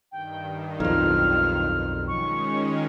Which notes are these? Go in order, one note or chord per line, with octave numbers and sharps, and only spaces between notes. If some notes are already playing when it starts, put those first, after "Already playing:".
G2 D#3 G5
B1 F2 D#4 F4 F6
D#3 G#3 C#4 C#6